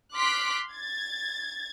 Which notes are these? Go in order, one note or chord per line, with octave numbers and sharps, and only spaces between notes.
C6 D6 F6 F#6 B6 D7
G#6 A6